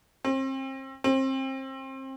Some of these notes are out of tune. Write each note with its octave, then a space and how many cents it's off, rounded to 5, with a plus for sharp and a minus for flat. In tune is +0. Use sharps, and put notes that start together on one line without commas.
C4 +35
C4 +30